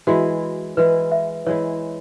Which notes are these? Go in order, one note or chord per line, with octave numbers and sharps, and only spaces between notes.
E3 G#3 E4 F#4
E3 G#3 E4 B4
E5
E3 G#3 E4 C#5